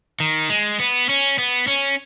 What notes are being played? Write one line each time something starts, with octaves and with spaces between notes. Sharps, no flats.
D#3
G#3
B3
C#4
B3
C#4